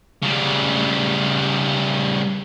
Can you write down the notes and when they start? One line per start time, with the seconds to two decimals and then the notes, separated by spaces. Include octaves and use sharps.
0.23 C#3 G3